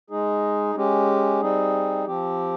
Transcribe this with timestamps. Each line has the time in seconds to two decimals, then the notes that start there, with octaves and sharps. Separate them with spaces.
0.10 G#3 D#4 G#4
0.75 G#3 C#4 G4
1.40 G3 C4 D#4 G#4
2.06 F3 C4 G4